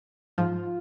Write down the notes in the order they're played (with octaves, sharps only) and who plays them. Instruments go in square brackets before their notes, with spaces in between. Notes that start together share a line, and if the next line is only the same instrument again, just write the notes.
[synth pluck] G#2 F3 [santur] F4